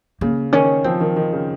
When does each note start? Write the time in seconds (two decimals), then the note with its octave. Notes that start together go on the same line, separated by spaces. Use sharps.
0.21 C#3 A#3
0.53 D#3 C#4
0.84 F3 C4
1.01 D#3
1.16 D#3
1.33 C#3